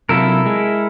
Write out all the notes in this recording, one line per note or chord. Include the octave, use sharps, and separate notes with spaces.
C3 F#3 E4 F4 A4 A#4
G#3 G#4